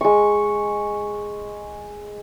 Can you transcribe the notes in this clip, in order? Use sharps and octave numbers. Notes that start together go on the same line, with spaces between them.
G#3 C#6